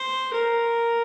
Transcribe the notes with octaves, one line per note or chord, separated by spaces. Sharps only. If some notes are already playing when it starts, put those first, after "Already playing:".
Already playing: C5
A#4